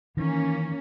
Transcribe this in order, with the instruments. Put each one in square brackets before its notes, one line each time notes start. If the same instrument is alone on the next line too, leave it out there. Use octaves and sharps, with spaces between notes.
[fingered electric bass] D#3 E3 [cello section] A#3 C#4